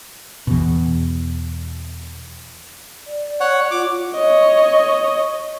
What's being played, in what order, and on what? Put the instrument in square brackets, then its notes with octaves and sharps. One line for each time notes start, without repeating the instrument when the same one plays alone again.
[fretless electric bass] E2 B2
[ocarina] D5
[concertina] C#5 F#5
[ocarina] F4 [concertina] D6
[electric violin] C#5 D#5